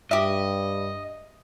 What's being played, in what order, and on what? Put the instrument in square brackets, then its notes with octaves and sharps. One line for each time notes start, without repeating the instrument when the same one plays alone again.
[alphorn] G2 [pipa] G4 E5 [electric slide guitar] D#5